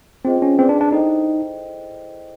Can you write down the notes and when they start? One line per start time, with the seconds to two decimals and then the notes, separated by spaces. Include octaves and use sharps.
0.25 C4 F4 G#4 C5 D#5 G5
0.42 C#4
0.59 C4 G#4 B4 D5
0.69 D4
0.81 D4
0.92 D#4 E4 A4 C5 D#5 G5